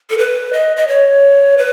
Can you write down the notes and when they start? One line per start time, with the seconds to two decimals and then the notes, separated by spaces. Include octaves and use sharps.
0.10 A4
0.18 B4
0.53 D#5
0.77 D#5
0.88 C#5
1.58 B4